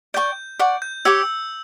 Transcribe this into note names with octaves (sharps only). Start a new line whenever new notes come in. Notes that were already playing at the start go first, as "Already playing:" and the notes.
D5 G5 C#6 G6
D5 F#5 C#6
G6
G4 C#5 G5 D6 E6